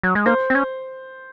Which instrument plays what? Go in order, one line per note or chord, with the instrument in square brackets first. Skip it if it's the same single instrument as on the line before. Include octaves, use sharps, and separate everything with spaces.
[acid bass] F#3
G#3
[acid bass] A#3 [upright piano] C5
[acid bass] C4
C#4